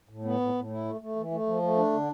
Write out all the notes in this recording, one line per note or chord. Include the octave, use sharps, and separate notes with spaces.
A2
B3
A2
A2
E4
A3
A3
E3
A3
F3
A3
D4
D3